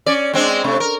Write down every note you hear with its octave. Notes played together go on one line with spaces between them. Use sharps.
C#4 D5
G#3 C4 D4
C3 A3
A#4